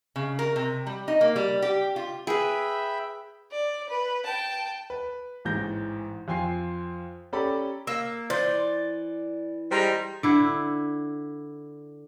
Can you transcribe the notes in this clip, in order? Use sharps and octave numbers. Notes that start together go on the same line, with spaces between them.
C#3
A#4
C3
G3
D#4
A#3
G3
G4
F4
G#4 B4 E5 G5 B5
D5
B4
G5 A5
B4
A1 G#2 E3 G6 A#6
F2 F4 G5 G#5 C6 C7
C#4 G4 A4 D5 A#5 B5
A#3 E6
E3 C5 D5
G3 G#3 C5 A#5
D3 E4